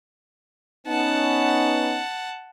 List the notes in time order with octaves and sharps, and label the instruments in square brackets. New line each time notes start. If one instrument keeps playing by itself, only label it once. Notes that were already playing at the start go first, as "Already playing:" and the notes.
[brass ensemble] B3 C#4 D#4 [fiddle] F#5 A5